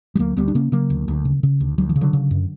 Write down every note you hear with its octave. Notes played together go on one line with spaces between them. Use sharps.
G3
D2 F#3 A#3
D2 G3 B3
D4
C#3 A#3 C#4
C#3 F#3 A#3
D2
D2
C#3
C#3
D2
D2 F#3
E3
C#3
D3 F#3
C#3
F#2